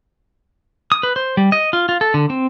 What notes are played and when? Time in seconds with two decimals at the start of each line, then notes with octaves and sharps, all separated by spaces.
0.92 D#6
1.03 B4
1.16 C5
1.37 G3
1.52 D#5
1.73 F4
1.89 F4
2.01 A4
2.14 D3
2.30 C4